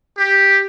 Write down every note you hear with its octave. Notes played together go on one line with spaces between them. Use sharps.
G4